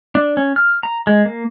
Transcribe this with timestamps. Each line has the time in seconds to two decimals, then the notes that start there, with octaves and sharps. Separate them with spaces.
0.15 D4
0.37 C#4
0.56 F6
0.83 A#5
1.07 G#3
1.25 A#3